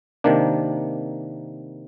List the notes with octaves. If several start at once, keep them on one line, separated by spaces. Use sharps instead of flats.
C3 D#3 A#3 D4